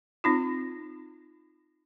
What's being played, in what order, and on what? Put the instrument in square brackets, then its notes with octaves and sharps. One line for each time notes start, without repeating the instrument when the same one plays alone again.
[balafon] C4 D#4 F4